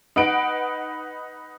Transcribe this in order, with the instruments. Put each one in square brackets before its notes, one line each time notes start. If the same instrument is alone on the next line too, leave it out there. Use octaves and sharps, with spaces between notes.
[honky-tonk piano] D#4 B4 F#5 D7